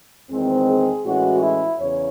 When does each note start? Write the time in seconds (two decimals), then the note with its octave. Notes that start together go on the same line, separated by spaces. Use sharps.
0.30 E2 D#3 G#3 C4
0.68 G#4
1.05 A2 E3 G#3 C#4 F#4
1.43 E4
1.80 E2 C#3 C#5